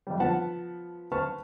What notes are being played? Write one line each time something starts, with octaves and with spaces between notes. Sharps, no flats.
F2 G3
F3 B3 F#5 A5
B4 C5 A5 C#6 F6